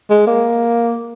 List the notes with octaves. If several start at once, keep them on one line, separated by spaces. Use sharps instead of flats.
G#3
A#3